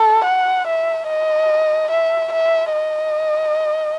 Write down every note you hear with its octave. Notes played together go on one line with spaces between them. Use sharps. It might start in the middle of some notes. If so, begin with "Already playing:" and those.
Already playing: A4
F#5
E5
D#5
E5
E5
D#5